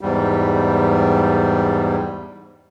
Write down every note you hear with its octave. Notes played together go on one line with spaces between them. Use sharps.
E2 G#2 G3